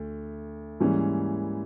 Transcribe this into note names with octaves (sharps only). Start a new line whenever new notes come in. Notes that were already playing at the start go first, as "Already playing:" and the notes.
Already playing: D2 A3
G#2 E3 G3 A#3 C#4